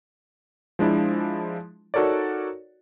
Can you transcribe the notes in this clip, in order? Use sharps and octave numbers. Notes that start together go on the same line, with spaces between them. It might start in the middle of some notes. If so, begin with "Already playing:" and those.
F3 G#3 D4 E4
D#4 F#4 A4 A#4 C#5 D5